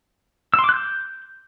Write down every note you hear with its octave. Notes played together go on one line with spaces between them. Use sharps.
E6
C6
D6
F#6
G6